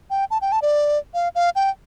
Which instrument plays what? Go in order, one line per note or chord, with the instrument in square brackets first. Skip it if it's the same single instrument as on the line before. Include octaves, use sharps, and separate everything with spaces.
[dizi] G5
A5
G5
A5
D5
F5
F5
G5